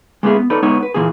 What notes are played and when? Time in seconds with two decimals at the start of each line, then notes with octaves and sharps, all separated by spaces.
0.23 G#3 A#3 B3 C#4 E4 G#4
0.36 B3
0.50 D#4 A4 B4 C#5 D5
0.63 G#3 B3 D#4 C#5
0.83 B4
0.94 A#2 D3 E3 A#3 F4 G#4